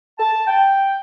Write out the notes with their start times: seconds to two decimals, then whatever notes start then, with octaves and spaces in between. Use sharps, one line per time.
0.19 A5
0.47 G5